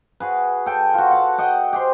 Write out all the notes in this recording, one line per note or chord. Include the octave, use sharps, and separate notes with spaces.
F#4 G#4 B4
A4 G5 G#5
F4 F#4
F#5 A5
D#5 F#5 G5
G4 G#4 C5